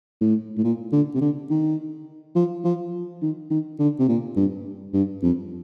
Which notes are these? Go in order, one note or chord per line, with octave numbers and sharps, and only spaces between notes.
A2
A2
A#2
D3
C3
D3
D#3
F3
F3
D#3
D#3
D3
C3
A#2
G2
G2
F2